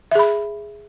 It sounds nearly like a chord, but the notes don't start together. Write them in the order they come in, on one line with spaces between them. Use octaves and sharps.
E5 G#4 B5